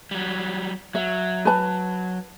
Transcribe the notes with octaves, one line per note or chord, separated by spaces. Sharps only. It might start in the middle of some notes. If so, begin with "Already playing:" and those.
F#3 G3
F#3 E5
B4 A5